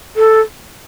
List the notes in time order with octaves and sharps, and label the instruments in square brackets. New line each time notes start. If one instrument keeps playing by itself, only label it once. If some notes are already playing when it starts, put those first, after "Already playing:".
[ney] A4